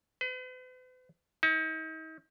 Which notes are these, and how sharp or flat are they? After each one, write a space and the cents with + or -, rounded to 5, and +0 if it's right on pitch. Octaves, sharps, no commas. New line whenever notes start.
B4 +45
D#4 +40